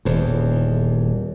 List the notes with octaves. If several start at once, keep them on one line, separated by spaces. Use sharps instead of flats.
D#1 E2